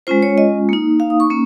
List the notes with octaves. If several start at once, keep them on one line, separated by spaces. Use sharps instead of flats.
G#3 C#4 F4 C5
C#5
D#5
A#3 D#4
F5
D#6
C#6
A#3 C#4